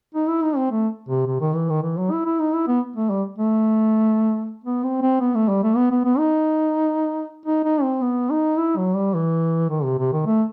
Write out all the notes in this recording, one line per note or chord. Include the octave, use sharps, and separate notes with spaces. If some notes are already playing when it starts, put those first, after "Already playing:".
D#4
E4
D#4
C4
A3
C3
C3
D#3
E3
D#3
E3
F#3
E4
E4
D#4
E4
B3
A3
G3
A3
B3
C4
C4
B3
A3
G3
A3
B3
B3
B3
D#4
D#4
D#4
C4
B3
D#4
E4
F#3
G3
E3
D#3
C3
C3
D#3
A3